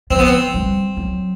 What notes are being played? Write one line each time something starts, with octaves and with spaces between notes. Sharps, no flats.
F3 C4
B3
C4
G3
F#3